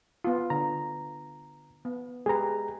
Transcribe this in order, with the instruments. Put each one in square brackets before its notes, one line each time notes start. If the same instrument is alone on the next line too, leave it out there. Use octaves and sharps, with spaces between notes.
[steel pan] B3 F4
[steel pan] D3 [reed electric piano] A#5
[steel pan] B3
[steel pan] G#3 G4 B4 [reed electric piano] G#4 A#5